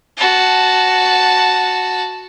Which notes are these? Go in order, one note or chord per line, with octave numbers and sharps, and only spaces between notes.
F#4 A5